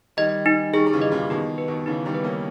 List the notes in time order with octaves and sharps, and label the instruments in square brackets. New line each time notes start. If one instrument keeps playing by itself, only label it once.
[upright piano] D#3 G3 [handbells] D#5
[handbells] D#4
[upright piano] D#3 G3 [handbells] G#4
[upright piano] G3
C#3 E3
[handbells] D#5
[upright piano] A#2 C#3
[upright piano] B2 D#3 [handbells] G4
[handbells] B4
[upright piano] B2 D#3
[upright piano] C#3 E3 [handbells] D#4
[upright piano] D#3 G3
[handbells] B4
[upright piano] A#3 C#4